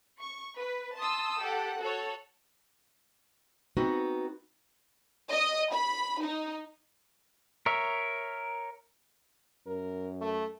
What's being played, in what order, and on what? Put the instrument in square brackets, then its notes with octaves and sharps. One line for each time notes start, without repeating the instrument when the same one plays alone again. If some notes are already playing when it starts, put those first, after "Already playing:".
[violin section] C#6
B4
A5 C6 D#6 E6
G4 A4 F#5
F#4 A4 C#5
[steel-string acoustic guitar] B3 C4 D#4 F#4 B4
[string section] D#5
B5
D#4
[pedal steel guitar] A#4 C#5 E5
[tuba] F#2 [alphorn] A#4
[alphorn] A3